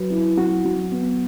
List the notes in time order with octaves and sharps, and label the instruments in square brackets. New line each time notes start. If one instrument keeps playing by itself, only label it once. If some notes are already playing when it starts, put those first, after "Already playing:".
Already playing: [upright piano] F#3 [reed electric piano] B4
[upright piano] E4
[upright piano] F#3 [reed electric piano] F#4
[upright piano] F#3
B3